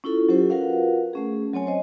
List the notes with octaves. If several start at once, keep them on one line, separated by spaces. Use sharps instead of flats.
C#4 E4 F4 A4
F#3 C#4 F4 G4 C5
F4 F#4 A#4 B4 F5 F#5
A3 C#4 G#4
F#3 C4 C#5 G#5
C5 D#5